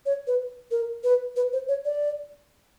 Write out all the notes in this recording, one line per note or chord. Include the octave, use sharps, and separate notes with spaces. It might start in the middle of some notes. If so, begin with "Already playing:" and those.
C#5
B4
A#4
B4
B4
C5
C#5
D5